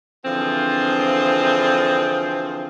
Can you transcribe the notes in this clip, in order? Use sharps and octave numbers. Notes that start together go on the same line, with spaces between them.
D3 E3 F3 C4 F4 G#4